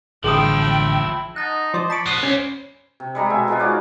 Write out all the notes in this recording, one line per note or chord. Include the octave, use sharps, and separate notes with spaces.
A1 D3 F3 E4 G#4 G5 D#6
D#4 F#5 A5
F3 C5 D5 D#5
A5 B5 C#6 D6
C5 D5 F#5 D#6
C#4
C3
G3 G#3 A#5 B5
B2 E5 G#5
F3 G#3 B3 F4
D#4 F#4 C#5 D5